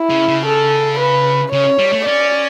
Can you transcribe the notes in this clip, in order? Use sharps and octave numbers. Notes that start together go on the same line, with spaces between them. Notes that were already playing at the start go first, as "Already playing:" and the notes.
Already playing: E4
C#3
C#3
A4
B4
C#3 C#5
G3
A3
C#4 D5